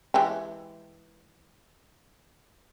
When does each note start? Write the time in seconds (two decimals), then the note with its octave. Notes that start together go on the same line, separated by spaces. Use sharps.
0.14 E3 G#3 G4